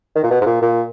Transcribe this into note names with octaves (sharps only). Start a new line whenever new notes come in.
D#3
A#2
B2
G#2
A#2
A#2